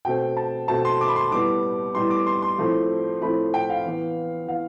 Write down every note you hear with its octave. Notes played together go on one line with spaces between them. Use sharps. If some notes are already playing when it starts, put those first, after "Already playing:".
B2 A3 C4 G5
A5
B2 A3 C4 A5
C6
D6
B5
C6
A2 G3 B3 D6
A2 G3 B3 C6
D6
C6
C6
A2 F3 A3 C4
A2 F3 A3 C4 B5
G5
F5
E3 B3
E3 B3 F5